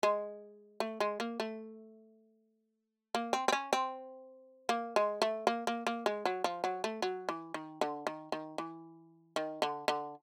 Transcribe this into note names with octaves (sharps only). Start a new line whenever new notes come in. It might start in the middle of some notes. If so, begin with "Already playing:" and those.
G#3
A3
G#3
A#3
A3
A#3
C4
C4
C#4
C4
A#3
G#3
A3
A#3
A#3
A#3
G#3
F#3
F3
F#3
A3
F#3
E3
D#3
D3
D#3
D#3
E3
D#3
D3
D3